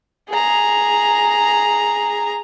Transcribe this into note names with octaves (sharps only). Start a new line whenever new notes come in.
G#4 A#5